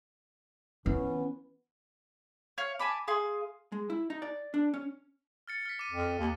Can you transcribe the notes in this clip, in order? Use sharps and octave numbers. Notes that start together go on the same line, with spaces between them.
E3 B3 C#4
C#5 F5
G#5 A5 B5 D6
G#4 F5 G#5 C6
G#3
E4
D#4
D5
D4
C#4
F6 A6 C#7
F6 B6
D6 D#7
F2
D#2